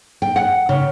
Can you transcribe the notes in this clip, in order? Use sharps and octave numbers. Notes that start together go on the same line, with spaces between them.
G5
F#5
C#3